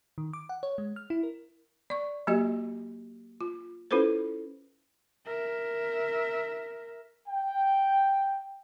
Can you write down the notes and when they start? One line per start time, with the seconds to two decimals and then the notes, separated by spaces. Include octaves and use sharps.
0.18 D#3
0.33 D6
0.49 F#5
0.63 C#5
0.78 G#3
0.96 F6
1.10 E4
1.23 A#4
1.90 D5 C#6
2.27 F#3 A#3 F#4 G4 D#5
3.41 F4
3.91 C#4 E4 F4 A4 B4 C5
5.27 A#4 E5
7.28 G5